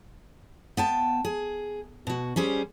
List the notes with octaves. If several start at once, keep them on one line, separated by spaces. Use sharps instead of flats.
B3 G5 A5
G#4
B2 F#4
G3 C#4 G#4 C5